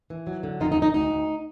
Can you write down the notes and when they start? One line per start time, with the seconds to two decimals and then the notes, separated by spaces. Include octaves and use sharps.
0.10 E3
0.27 F#3
0.43 D3
0.60 F2 D#4 F4
0.72 D#4
0.77 F2
0.82 D#4
0.94 D2 D#4
1.11 D2